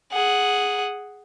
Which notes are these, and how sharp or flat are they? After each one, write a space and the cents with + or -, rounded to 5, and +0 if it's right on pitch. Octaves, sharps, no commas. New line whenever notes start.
G#4 +0 F#5 +0